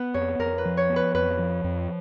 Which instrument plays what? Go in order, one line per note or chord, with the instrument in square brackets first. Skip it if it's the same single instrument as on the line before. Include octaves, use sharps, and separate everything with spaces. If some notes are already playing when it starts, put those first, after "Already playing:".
Already playing: [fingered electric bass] B3 [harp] B4
[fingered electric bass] F2 [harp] C#5
[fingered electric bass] F2 [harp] A#4
[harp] B4
[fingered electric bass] F3
[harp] C#5
[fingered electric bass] B3
[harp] B4
[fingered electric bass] F2 [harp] B4
[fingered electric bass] F3
F2